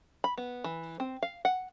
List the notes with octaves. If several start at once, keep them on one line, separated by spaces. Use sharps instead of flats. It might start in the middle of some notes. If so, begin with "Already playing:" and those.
B5
B3
E3
C4
F5
F#5